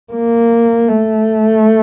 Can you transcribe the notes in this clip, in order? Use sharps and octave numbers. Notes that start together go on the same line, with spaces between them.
A#3
A3